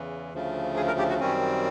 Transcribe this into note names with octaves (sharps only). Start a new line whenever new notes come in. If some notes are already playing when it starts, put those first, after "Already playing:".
Already playing: E2 C#3 E3
D2 C#3 F3 A3
G#4
A#4
G4
F#4
F#2 D#3 G3 C4 C#4